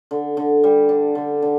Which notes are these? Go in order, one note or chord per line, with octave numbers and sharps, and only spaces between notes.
D3
D3
G3
D4
D3
D3